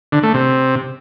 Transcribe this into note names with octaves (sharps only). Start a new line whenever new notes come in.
D3
A3
C3